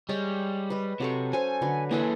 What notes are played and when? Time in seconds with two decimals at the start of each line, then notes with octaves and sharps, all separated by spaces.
0.09 G3 G#3 C#5 D#5
0.70 B4 D#5
1.00 C3 F#3 A4 C#6
1.33 C#4 A4 C5 G#5
1.62 D3 F#3 B4
1.91 E3 A#3 G#4 A4 B4